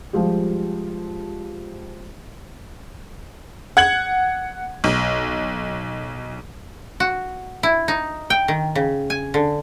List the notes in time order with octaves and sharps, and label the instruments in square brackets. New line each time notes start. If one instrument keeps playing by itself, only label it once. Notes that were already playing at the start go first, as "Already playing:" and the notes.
[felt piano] F3 G3 G#3 F4 G4
[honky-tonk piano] F#5 G#6 F#7
B1
[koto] F#4
E4
D#4
G5
D#3
C#3
G#5
D3